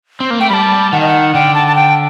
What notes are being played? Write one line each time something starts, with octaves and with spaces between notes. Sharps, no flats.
C4
A#3
A3 G5
G3 A5 B5
D#3 F#5
D#5
F#5
D3 G5
A5
A5
G5